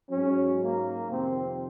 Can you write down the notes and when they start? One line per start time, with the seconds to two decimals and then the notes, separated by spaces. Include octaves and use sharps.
0.10 G#2 F#3 C#4
0.60 A#3
1.10 F2 C3 D#3 C4